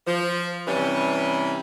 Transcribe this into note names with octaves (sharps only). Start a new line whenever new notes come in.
F3
C3 E3 G3 C#4